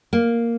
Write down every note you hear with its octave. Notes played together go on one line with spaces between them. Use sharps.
A#3